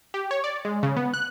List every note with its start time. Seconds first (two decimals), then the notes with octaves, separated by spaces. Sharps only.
0.14 G4
0.31 C#5
0.44 D5
0.65 G#3
0.83 C#3
0.97 B3
1.14 F#6